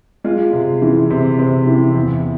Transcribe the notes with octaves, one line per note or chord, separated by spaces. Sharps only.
G#3 F4
C3
E3
C3
C3
E3
E2